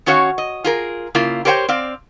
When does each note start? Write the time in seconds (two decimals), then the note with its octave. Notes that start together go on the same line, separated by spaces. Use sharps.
0.06 D#3 C#4 F#4 C#5 F5
0.38 D#5
0.64 F4 G#4 A#4
1.15 C#3 A#3 E4 F4
1.45 G4 A#4 C5 C#5 F#5 G5
1.69 C4 D5 F5